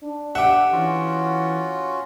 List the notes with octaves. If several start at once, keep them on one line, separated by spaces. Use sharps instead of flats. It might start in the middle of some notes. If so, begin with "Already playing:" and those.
D4
G4 A4 E5 F#5
E3 C#4 F4 F#4